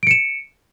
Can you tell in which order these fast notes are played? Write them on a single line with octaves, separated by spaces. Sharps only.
D7 C#7 E7